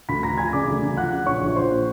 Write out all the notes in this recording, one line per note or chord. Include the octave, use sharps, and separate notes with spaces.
D2 B5 B6
D2 A#5 A#6
F3 G#5 G#6
C#3 D5 D6
D2
D2
F3 F#5 F#6
C#3
A#1 C#5 C#6
A#1
F3 C5 C6
A#2